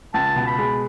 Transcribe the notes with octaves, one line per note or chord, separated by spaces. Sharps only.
C#2 A5
B2
B5
G#3